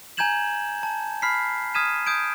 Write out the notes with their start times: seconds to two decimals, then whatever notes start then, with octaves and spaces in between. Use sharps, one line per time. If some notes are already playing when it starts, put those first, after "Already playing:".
0.17 G#5 A#5 G6 G#6 E7 F#7
0.83 A5
1.22 B5 F6 B6 C7
1.75 D#6 F6 G#6 B6 D#7 E7
2.07 D#6 G6 G#6 D7